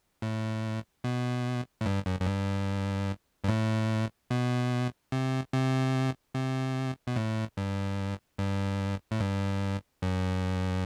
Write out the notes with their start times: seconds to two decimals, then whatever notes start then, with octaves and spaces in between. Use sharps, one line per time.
0.22 A2
1.04 B2
1.81 A2
1.85 G2
2.06 F#2
2.20 F#2
2.26 G2
3.44 G2
3.48 A2
4.30 B2
5.12 C3
5.53 C3
6.35 C3
7.07 B2
7.16 A2
7.57 G2
8.38 G2
9.11 A2
9.20 G2
10.02 F#2